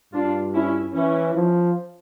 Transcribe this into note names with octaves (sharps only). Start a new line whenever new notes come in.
G2 D4 F4
C#4 E4
E3 C#4 E4
F3